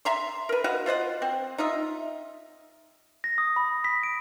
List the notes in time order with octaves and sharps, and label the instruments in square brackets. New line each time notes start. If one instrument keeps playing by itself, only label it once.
[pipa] E5 A#5 C6
A#4 B4
F#4 D#5 F5 F#5
F4 C5 D#5 F#5
C4
D#4 F4 D#5 E5
[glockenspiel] A#6
D#6
B5
B6
D7